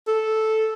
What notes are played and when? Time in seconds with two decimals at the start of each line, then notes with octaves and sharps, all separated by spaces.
0.07 A4